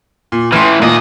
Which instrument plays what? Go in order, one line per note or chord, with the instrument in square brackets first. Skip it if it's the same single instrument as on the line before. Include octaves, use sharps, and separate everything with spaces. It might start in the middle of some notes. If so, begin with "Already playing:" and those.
[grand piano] A#2
[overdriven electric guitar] A2 E3 [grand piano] C6 F6
[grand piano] A#2 [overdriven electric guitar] A#3 D#5